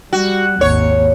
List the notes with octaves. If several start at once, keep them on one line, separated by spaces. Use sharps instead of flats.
G3 F#4
G#1 D#2 C#5